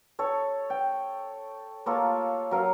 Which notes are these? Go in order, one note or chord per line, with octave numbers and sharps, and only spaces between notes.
A4 C#5
G5
A#3 F4 A4 C#5
F#3 A#4 F5